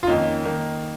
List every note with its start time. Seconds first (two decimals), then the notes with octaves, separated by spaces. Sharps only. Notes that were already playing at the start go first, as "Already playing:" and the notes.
0.03 F4
0.07 F2 D#3 A#3 C#4 D#4
0.45 D#3 A#3 D#4